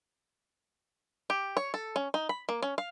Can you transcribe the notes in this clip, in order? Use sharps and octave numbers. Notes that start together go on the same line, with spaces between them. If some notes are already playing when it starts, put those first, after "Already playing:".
G4
C#5
A4
C#4
D#4
B5
A#3
C#4
F5